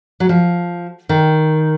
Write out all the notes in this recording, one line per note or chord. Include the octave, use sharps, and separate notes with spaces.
F#3
F3
D#3